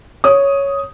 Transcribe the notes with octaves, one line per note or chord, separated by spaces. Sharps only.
C#5 D#6